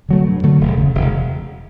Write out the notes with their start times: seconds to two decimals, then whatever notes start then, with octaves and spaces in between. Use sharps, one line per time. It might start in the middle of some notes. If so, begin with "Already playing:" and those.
0.09 D3 F#3 A3
0.26 G2
0.43 D3 F#3 A3
0.60 E1
0.77 D2 C#3
0.95 E1